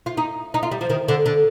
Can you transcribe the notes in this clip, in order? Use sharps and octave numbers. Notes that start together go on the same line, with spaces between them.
F4
D#4
D#4
F4
G3
F3
D#3
D3
D3